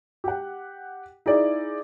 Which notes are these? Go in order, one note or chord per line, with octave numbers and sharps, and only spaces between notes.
G4 F#5
D#4 E4 G#4 D5